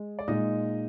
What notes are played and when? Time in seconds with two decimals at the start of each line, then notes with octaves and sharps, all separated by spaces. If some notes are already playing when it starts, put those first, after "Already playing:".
Already playing: G#3
0.19 D5
0.28 A#2 G#3 D#4 D#5